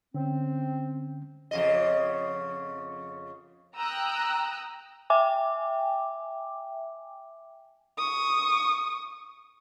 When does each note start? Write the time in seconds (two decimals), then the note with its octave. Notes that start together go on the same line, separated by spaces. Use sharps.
0.15 D3 C4 C#4
1.51 F2 C#3 D#5
3.75 G5 A#5 D#6 E6 F#6
5.10 E5 G5 G#5 D6
7.98 C#6 D#6